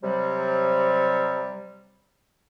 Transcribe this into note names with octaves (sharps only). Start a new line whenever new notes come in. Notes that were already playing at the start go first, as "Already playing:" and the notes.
C3 F#3 G3